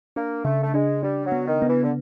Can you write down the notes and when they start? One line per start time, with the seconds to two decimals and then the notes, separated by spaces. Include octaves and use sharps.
0.16 A#3 D4
0.45 C#3 A3
0.63 A3
0.74 G#3 D4
1.03 G3 D4
1.25 F#3
1.32 B3
1.47 D#3
1.62 B3
1.69 E3
1.84 D3